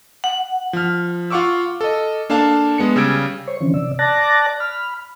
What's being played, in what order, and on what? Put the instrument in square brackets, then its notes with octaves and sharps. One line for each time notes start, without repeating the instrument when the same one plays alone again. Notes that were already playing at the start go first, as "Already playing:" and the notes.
[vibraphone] F#5
[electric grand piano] F3 F6
F4 F5 F#5 C#6 D6 E6
A4 D#5
A#3 D4 A4 F5 A5
G#3 B3 C#7
C#3 G3 E6 G#6 D7
[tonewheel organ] C5 C#5 C#6
D3 E3 F3 C4 C#4
C3 D5 E6
D5 A5 D6 F#6 A6 A#6
B5 F6